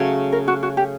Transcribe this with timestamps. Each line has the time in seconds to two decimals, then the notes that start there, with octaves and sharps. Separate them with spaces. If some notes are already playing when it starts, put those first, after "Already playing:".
Already playing: C#3 F#3 A3 C#4
0.32 A#4
0.48 F#4
0.63 F#4
0.77 G4